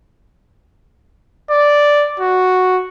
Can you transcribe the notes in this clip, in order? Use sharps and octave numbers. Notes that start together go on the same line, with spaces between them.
D5
F#4